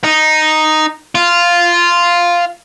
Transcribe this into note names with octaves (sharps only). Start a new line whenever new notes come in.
D#4
F4